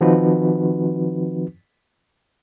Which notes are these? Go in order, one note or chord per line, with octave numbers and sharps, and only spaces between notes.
D#3 F3 C4 D#4 F#4 B4